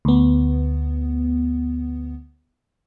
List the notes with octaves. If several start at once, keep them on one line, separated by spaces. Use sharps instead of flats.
D2 B3